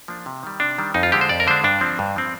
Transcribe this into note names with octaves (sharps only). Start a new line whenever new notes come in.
F3 A#3 D4
C3
D#3 G3
C3 D4
D#3 G3
F2 D#4
F4
D3 G#3 D4 G4
C5
F2 D5
A#4
D3 G#3 D4 C5
G2 D4
F3 C4
G2
F3 C4